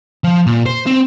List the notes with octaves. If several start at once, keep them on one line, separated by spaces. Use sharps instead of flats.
F3
A#2
C5
C4